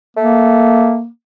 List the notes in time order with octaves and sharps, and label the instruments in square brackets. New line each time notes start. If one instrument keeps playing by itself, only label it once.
[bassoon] A3 [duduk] A#3